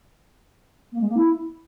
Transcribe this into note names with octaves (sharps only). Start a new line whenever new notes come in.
A#3
G#3
A#3
E4